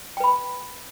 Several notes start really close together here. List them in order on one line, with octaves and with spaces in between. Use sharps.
G5 B4 B5